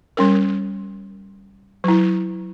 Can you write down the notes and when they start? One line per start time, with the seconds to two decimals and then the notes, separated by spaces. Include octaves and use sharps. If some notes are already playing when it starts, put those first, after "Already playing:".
0.17 G3 C#4 A#4
1.84 F#3 E4